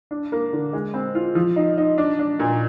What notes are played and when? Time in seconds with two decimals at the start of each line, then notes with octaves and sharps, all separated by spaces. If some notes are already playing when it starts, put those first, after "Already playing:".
0.11 D4
0.32 A#3
0.53 D3
0.73 G#3
0.94 C4
1.15 F4
1.35 F3
1.56 D#4
1.78 D#4
1.98 D4
2.19 D4
2.39 A#2